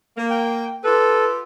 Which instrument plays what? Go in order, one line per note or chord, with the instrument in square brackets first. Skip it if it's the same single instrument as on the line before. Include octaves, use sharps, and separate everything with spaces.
[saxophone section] A#3
[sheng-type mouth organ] G5
[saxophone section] F4 G4 B4 [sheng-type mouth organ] A4